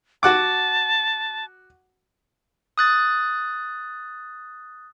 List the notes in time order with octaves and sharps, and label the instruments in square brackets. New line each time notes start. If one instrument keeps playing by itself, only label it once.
[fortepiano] F#4 F#5 D6 [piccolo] A5
[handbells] D#6 F#6 A6